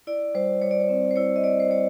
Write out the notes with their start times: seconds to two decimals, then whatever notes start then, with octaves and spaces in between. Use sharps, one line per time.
0.07 E4 D5
0.35 G3 C5
0.61 G3 C#5
0.71 D5
0.80 C#5
0.89 C4
1.11 C5
1.16 E4 C#5
1.36 D#5
1.43 G3 D5
1.60 C5
1.70 G3 C#5